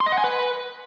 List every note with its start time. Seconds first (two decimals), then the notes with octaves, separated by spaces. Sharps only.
0.01 C6
0.06 D#5
0.12 F#5
0.18 G#5
0.24 B4